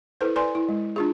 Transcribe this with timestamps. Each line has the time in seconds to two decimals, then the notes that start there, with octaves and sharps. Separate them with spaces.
0.21 E4 A4 B4 C5
0.36 B4 D5 G#5 C6
0.55 E4
0.69 G#3
0.96 D4 F4 G#4